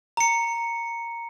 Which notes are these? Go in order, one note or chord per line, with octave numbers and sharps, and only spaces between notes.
A#5 C#7